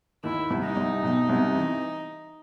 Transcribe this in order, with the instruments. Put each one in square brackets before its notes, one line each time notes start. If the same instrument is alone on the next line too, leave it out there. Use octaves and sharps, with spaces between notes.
[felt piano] D#2 D#3 [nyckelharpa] E4
[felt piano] C2 C3
[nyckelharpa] D#4
[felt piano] C2 C3
B1 B2
C2 C3
E3